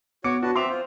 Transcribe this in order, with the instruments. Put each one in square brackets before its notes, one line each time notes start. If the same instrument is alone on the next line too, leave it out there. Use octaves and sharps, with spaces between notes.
[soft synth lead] B3 [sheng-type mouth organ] F#4 C#5 [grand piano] D6 C#7
[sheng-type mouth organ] D4 B4 A5 [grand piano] F#4
[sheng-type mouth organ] C4 E5 [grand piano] C6 D6 F7
[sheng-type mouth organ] F4 [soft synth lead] C5